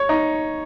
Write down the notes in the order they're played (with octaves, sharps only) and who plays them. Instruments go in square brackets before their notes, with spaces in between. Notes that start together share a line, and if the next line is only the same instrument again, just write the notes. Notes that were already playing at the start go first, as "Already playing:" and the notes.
Already playing: [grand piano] C#5
D#4